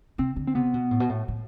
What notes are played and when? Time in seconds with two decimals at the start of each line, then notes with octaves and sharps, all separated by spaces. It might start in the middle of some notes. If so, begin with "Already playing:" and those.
0.18 C3 C4
0.36 D3
0.47 C4
0.55 C3 B3
0.74 B2
0.91 A2
1.00 B2
1.09 A2
1.28 A2